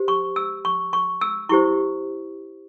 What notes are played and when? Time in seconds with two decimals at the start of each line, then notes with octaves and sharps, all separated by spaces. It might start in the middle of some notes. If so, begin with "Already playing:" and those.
Already playing: G4 C5
0.08 C#6
0.36 E6
0.65 C#6
0.93 C#6
1.21 E6
1.49 E4 G4 C5 C#6